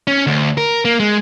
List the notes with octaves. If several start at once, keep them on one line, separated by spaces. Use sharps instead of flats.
C#4
D2
A#4
A#3
G#3